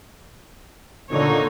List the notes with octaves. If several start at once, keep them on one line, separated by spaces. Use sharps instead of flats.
A#2 D3 D#4 C#5